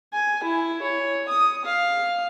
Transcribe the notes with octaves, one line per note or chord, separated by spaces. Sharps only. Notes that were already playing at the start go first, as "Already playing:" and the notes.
G#5
E4
C#5
D#6
F5